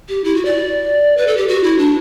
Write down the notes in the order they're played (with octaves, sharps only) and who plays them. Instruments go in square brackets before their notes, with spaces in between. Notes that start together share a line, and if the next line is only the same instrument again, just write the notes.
[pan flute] G4
E4
F#4
D5
B4
A4
G4
F#4
E4
D4